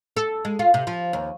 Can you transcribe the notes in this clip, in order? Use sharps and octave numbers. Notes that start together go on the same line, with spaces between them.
A4
G#3
F4
C3
F3
D#2